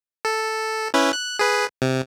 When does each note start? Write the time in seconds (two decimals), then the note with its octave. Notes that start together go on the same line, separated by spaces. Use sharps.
0.25 A4
0.94 C#4 E4 B4
1.13 F#6
1.39 G#4 B4
1.82 C3